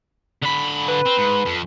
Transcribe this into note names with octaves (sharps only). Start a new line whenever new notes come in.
D3 B5
B4
C4
G#2
F2